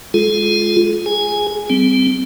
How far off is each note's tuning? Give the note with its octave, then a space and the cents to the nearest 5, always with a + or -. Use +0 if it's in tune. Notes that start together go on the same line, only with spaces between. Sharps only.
G#3 +5 F4 +0 A4 -45
G#4 +0 G#5 +0
G3 -10 C4 -25